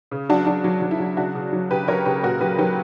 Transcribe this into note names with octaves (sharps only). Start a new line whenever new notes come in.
C#3
F#3 D4 F#4
F#3 D4
F#3
F#3
E4
F#3
C#3 D4 F#4
C#3
F#3
C#3 G4 B4
F#3 A#4 C#5
C#3 G4 B4
A#2 F#4 A#4
F#3 G4 B4
F#3 G4 B4